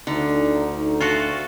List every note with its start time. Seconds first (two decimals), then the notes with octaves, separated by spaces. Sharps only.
0.07 D2 D3 D#4
1.00 F4 F#4 A4